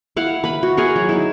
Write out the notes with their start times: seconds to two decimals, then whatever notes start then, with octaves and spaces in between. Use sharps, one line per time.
0.17 E4 F5 F#5
0.44 B4 B5
0.63 F#4
0.77 G#4 A#4 F#5
0.96 F#3
1.09 D#4 E4